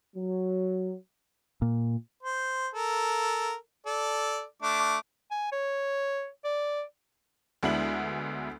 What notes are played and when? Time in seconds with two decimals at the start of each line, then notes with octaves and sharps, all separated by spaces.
0.16 F#3
1.62 A#2
2.23 C5
2.74 A4 A#4
3.86 A4 D5
4.62 A3 D4 D6
5.31 G#5
5.52 C#5
6.44 D5
7.63 D2 G#3 B3 D4 E4 F#7